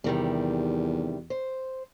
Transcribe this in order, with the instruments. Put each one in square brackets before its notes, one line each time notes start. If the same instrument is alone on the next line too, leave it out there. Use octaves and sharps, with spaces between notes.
[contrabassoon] E2 [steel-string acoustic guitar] C3 D#3 G3
[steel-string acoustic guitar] C5